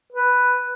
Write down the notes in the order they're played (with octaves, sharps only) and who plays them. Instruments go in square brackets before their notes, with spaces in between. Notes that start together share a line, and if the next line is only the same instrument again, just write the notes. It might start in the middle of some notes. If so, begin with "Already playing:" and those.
[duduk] B4